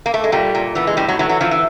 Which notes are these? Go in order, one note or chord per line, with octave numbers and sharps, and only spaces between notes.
A#3
A3
G#3
A#2 G3
A#2
E3 B3
G#3
A2 G3
F#3
E3 F#3
F#3
E3 F3
E3